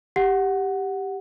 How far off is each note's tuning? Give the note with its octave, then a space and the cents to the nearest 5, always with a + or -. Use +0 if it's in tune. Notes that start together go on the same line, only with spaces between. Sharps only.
G4 +0 F#5 +0